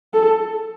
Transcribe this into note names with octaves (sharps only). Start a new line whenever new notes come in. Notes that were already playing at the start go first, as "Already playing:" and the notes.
A4